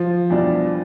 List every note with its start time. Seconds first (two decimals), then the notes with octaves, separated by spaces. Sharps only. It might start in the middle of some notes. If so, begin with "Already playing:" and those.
Already playing: F3
0.30 E2 B2 G3 D4